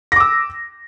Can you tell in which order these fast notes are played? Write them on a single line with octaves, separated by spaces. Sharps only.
A#6 D6 E6